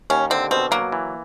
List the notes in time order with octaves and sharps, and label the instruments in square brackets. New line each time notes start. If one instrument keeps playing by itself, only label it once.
[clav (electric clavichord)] D#2 [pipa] C#4
[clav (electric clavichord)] D3 [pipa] C4
[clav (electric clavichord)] B2 [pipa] C4
[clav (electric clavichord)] F#3 [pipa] A#3
[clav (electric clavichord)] E3